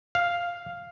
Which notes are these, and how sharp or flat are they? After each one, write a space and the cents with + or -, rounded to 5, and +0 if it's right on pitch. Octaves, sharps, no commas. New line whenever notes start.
F5 +0